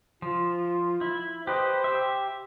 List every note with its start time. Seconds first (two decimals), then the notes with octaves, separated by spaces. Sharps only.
0.22 F3 F4
1.01 E4
1.47 G4 B4 C5 D#5
1.84 G4 E5